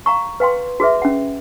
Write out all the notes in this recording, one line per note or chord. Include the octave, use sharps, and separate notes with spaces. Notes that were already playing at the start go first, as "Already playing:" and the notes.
F5 A#5 C#6
B4 F5 G5 C6
F#4 G#4 B4 E5
C#4 F#5